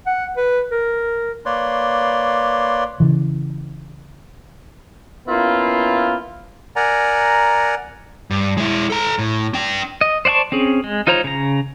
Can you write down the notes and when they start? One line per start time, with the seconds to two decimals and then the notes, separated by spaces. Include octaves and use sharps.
0.06 F#5
0.37 B4
0.71 A#4
1.46 A#3 B4 C#5 D5 C6
3.00 C#3 E3
5.28 A#3 B3 C#4 E4 F4
6.76 A#4 D5 F#5 G#5 A#5
8.31 G2
8.57 G#3 E4
8.90 A4 A#5
9.19 A2
9.54 D4 G5
10.01 D#5
10.25 C5 D5 F#5 A5 C#6
10.52 C4 C#4 G#4
10.84 G#3
11.07 D#4 F4 C5 C#5 A#5
11.24 C#3 A#5